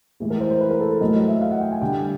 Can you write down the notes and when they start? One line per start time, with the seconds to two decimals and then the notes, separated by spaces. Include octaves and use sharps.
0.20 A2 E3 G#3 G#4
0.30 A#4
0.40 C5
0.51 C5
0.61 B4
0.71 A#4
0.80 A4
0.91 A4
1.01 A2 F#3 A3 D#5
1.14 D#5
1.28 E5
1.41 F5
1.51 F#5
1.61 G5
1.71 G#5
1.81 D3 G3 G5